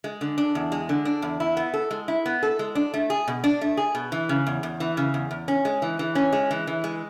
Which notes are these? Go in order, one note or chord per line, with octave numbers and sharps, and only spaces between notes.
G#3
D3
D4
E2
G#3
D3
D4
E2
E4
B3
A4
G#3
E4
B3
A4
G#3
D4
A3
G#4
B2
D4
A3
G#4
B2
E3
C#3
E2
E2
E3
C#3
E2
E2
C#4
G#3
E3
E3
C#4
G#3
E3
E3
G#3